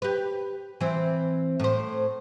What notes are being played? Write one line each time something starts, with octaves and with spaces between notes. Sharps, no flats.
G4 B4
E3 C4
A2 C5